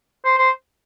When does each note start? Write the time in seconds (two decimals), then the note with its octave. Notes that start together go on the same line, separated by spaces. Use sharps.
0.25 C5
0.38 C5